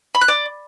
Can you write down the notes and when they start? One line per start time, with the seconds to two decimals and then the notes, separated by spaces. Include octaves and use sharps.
0.15 B5
0.21 F#6
0.28 D5